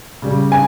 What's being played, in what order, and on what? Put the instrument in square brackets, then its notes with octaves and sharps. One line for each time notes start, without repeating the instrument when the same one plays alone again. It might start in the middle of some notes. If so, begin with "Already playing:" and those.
[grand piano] C#3 G3
[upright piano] G#5